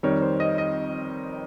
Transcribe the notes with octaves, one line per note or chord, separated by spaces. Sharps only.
F2 D#3 G3 C#5
C5
D#5
D#5